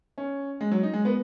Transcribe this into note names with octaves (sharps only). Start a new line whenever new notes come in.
C#4
G#3
F#3
D#4
G#3
B3